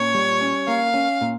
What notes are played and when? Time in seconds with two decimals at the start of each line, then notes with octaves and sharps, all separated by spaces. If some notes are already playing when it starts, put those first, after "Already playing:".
Already playing: A#2 C#4 C#5
0.14 G3
0.41 C#4
0.68 A#3 F5
0.94 C#4
1.21 A#2